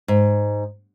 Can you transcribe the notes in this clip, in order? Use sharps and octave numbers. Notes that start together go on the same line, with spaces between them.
G#2